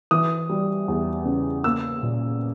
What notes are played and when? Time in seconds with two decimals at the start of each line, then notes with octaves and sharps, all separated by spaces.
0.11 E3 D#6
0.50 G3
0.88 E2
1.25 C#3
1.64 A#3 E6
2.03 A#2